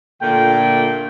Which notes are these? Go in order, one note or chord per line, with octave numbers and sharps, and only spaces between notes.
A#2 D3 A3 F4 G5